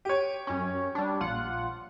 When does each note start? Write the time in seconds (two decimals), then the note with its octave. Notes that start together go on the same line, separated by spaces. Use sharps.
0.05 G4 C#5 D7 D#7
0.47 F#2 C#4
0.95 G3 D4
1.20 A#1 F4 F#5